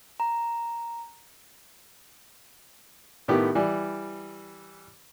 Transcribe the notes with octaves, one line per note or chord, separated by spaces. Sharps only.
A#5
A2 D#3 B3 G4
E3 G3